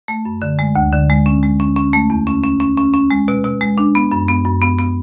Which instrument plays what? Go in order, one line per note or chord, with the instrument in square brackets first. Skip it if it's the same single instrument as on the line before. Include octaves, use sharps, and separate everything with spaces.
[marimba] A3
F#2
D3
G#3
D2
D3
G#3
C#4
G#3
C#4
C#4
A3
E2
C#4
C#4
C#4
C#4
C#4
G#3
B2
B2
G#3
D4
B3
F#2
B3
F#2
B3
B3